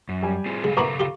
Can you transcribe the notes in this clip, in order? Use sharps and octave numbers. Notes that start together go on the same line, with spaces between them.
F#2
G3 G#5
C4 F4 G#4
C#3 G#3 A4 F5
A#2 B3 E4 A#5 C#6 D6
F4 G4